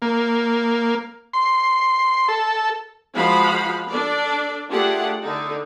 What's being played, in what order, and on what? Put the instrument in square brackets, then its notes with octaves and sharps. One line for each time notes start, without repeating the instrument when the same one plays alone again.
[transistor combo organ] A#3
C6
A4
[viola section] F3 G#3 F#4 F5 F#5 B5
D4 A4 D5
A3 D4 F4 G4 G#4 F#5
D3 D#4